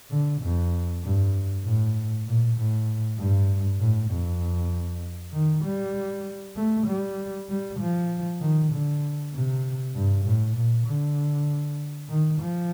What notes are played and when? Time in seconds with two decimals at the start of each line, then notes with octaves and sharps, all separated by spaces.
0.11 D3
0.42 F2
1.04 G2
1.65 A2
2.26 A#2
2.57 A2
3.18 G2
3.80 A2
4.11 F2
5.33 D#3
5.65 G3
6.56 A3
6.87 G3
7.49 G3
7.80 F3
8.41 D#3
8.72 D3
9.33 C3
9.95 G2
10.26 A2
10.57 A#2
10.87 D3
12.10 D#3
12.41 F3